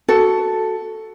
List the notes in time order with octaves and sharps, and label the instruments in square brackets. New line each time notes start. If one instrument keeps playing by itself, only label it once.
[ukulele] F#4 A4